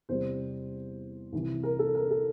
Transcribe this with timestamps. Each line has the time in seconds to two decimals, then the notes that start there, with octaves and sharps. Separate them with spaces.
0.09 E2 C3 G3 C5
1.33 C2 C3 E3
1.63 A#4
1.79 A4
1.95 A#4
2.11 A4